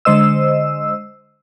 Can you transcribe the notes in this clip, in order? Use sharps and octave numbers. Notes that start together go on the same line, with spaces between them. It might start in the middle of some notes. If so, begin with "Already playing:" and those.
D3 G#3 C5 D#5 E6